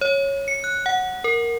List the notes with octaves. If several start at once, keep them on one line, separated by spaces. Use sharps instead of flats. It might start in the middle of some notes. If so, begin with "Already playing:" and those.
C#5
C#7
F#6
F#5
A#4